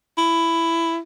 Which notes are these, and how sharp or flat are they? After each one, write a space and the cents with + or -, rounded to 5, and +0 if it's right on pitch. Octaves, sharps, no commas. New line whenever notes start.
E4 +10